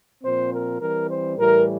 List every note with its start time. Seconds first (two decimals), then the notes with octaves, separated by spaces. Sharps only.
0.23 A#2 F3 C4 C5
0.52 A#4
0.80 E3 G3 C4 A#4
1.09 C5
1.37 A2 E3 G3 A#4